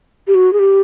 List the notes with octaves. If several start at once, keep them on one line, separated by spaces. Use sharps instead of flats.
G4
F#4
G#4
G4